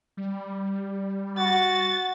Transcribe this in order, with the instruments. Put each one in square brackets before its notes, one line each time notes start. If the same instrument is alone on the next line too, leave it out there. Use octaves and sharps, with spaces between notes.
[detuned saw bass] G3
[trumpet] F#4 [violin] A6